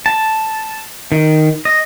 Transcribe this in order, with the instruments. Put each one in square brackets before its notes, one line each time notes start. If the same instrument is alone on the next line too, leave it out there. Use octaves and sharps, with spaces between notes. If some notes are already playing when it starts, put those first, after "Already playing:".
[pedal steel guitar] A5
D#3
D#5